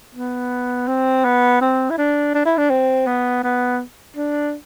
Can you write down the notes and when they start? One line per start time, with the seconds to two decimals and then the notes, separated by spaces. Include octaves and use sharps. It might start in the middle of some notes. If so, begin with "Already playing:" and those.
0.15 B3
0.88 C4
1.25 B3
1.61 C4
1.90 E4
1.98 D4
2.34 D4
2.45 E4
2.58 D4
2.70 C4
3.07 B3
3.43 B3
4.16 D4